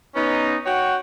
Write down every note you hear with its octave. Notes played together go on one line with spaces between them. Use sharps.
B3 C#4 D#4
F#4 C#5 F#5 G5